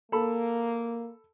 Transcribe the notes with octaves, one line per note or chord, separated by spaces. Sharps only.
A#3 A4 B5